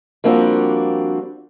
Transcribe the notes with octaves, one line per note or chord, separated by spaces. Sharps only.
F3 G3 A#3 C4 D4 F#4